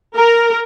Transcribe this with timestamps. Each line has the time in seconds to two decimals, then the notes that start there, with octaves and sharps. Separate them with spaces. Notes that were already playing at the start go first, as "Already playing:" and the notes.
0.15 A#4